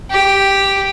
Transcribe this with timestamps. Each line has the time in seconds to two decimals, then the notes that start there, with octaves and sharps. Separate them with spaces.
0.10 G4